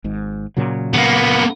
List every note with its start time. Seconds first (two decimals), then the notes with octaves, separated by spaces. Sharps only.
0.04 G#1 G#2
0.57 A#2 C#3 F#3
0.93 A#3 B3